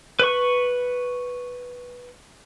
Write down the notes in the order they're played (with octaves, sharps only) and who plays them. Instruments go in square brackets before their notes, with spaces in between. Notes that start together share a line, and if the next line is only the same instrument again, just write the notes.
[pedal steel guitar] B4 C#6